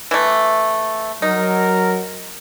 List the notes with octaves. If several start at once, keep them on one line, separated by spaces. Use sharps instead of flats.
E3 A3
F#3 D#4 A#4